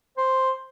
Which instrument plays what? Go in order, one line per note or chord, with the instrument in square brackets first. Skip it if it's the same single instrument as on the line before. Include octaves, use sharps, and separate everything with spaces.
[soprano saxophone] C5